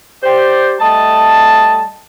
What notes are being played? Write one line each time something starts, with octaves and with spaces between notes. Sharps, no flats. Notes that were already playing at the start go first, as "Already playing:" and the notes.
G4 C5 D5
G3 A3 D#5 A5